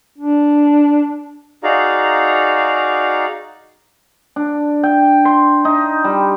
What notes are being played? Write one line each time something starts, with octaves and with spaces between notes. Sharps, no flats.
D4
D#4 F#4 G#4 D5 F5 A#5
D4
G5
C6
D#4
G3